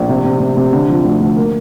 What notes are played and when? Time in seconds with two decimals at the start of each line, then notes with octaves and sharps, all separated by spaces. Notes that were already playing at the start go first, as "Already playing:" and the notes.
Already playing: A#1
0.09 C3
0.24 C3
0.40 C3
0.57 C3
0.73 D3
0.89 F3
1.04 D2
1.20 D2
1.36 A#3